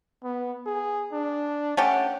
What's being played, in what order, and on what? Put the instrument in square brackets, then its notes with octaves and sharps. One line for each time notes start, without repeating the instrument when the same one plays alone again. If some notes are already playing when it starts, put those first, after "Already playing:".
[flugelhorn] B3
G#4
D4
[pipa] A3 C#4 G4 [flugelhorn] F#5